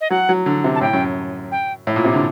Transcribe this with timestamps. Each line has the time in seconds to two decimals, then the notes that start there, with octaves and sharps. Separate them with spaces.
0.01 D#5
0.10 F#3 F#5
0.29 F#3
0.46 D3
0.64 C3
0.75 A5
0.81 A2 G5
0.93 F#2
1.52 G5
1.87 A2
1.96 A#2
2.04 C3
2.13 D3